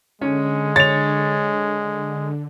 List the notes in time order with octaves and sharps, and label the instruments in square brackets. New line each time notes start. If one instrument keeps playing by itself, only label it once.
[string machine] D3 [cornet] G#3 [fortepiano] C#4
[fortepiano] C#5 [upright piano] A6 F7